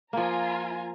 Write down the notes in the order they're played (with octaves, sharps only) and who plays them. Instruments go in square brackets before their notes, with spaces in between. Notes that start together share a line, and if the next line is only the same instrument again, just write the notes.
[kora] F3 A#3 [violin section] F4 G#5 A#5